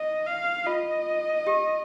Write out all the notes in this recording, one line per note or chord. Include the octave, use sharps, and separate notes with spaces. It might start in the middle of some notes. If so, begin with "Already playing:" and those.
Already playing: D#5
F5
F4 D#5
G4